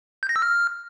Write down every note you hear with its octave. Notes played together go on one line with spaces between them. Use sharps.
G6
A#6
E6
F6